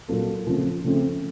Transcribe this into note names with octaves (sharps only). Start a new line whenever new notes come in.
A#2 F#3 A#3 F4 A4
C#3 F3 A3 C4
C#3 F3 A3 C4